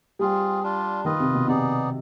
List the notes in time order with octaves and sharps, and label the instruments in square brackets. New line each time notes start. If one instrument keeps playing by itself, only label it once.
[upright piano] G3 [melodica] C4 F4 G#4
[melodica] G3 D4 F4
[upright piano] D#3 [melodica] F4 B4 D#5
[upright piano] C3
B2
[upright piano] C3 [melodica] B3 D#4 G#4 D5